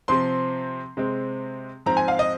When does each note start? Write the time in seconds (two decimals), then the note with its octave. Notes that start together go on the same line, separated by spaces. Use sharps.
0.08 C3 F3 C4 C6
0.97 C3 G#3 C4
1.86 G#2 F3 C4 A#5
1.97 G#5
2.08 F5
2.19 D#5